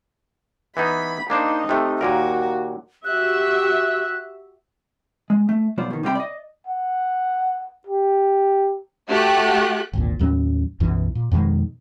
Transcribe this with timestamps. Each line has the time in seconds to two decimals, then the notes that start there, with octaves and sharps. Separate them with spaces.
0.77 E3 B3 D#4 B5
1.30 A#3 D4 D#4 C5
1.69 C3 A3
2.01 D#2 A#2 F#4 A#4
3.05 F#4 G4 E5 F#6
5.30 G#3
5.49 A3
5.78 B1 F#3 B3 F4 C5 D5
5.91 B2 D#3
6.03 C3 G3 C4 F4 G5 B5
6.15 D5 D#5
6.67 F#5
7.87 G4
9.08 A3 F#4 G4 F#6
9.93 G#1 D2 A#2
10.19 D#2 A2 F#3 C#4
10.80 B1 F#2 B2 E3
11.15 A#2
11.32 F2 B2 D#3 G#3